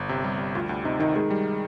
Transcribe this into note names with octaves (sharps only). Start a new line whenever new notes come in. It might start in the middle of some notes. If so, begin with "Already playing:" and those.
Already playing: G1
C3
G3
G3
D2 F4
D2
C3 D#4
D#3 D#4
D#3 G#3
G3